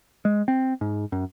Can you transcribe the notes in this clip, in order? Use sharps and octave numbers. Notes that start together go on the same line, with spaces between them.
G#3
C4
G#2
F#2